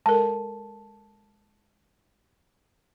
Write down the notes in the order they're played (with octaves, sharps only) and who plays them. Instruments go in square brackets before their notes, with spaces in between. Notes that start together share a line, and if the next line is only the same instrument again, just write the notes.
[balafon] G#3 A4 A#4 [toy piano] A5